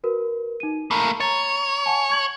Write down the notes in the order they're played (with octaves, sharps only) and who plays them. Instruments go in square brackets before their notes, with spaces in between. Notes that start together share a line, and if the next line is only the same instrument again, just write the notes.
[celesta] F#4 A#4 B4
D#4 D#7
[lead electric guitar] A3 A#3 [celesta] A#5 B5
[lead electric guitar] C#5 [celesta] A#5 A6
[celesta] F#5 G#5 A5
C#6 G#6 F#7